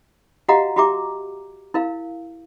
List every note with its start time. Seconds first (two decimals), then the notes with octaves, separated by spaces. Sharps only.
0.48 F#4 G4 D#5 F5 F#5 A#5
0.76 F#4 G4 E5 A#5 D6
1.74 E4 A#4 F5